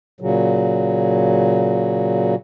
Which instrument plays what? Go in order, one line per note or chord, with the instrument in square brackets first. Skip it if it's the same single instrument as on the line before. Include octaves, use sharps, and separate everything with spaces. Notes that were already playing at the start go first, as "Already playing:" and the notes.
[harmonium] A#2 C#3 F#3